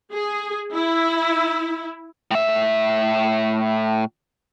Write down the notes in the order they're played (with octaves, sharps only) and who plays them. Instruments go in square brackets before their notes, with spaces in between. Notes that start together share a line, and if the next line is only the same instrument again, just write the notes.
[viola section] G#4
E4
[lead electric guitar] A2 E5